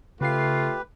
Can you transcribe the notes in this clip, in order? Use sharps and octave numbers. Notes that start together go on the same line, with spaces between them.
C#3 A3 F4 G4 B4 C7